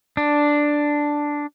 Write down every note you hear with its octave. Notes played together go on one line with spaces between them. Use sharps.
D4